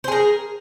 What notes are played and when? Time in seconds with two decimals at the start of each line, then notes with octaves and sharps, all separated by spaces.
0.04 C5
0.08 G#4
0.12 A#4